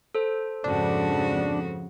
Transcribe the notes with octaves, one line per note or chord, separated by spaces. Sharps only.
A4 C5
F2 G#2 C#3 D4 F#4